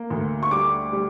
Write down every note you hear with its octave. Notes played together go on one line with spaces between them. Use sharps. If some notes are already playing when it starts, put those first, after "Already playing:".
Already playing: A#3
D2
C#6
G3 D6
G3